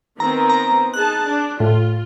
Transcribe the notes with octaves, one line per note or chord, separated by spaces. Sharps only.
D#3 B3 C4 A#5
A#5
D#4 G#4 A5 F#6
D4
A2 F4